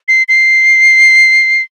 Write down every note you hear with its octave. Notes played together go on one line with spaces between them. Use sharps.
C7
C7